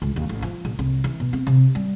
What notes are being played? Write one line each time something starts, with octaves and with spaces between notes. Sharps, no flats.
C#2
D#2
A1
F3
A#1
C2
E3
B2
C4
C3
G3